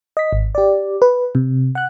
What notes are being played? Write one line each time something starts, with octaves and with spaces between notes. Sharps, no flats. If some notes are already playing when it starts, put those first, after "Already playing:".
D#5 B6
G#1
G4 D5
B4
C3
F#5 F#6